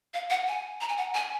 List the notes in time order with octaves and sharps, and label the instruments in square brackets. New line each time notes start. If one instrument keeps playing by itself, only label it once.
[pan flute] F5
F#5
G#5
A#5
G#5
F#5
G#5